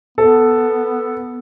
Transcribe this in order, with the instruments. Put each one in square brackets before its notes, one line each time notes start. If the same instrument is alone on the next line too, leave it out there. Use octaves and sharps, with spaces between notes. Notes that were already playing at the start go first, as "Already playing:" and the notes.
[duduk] B3 [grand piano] A4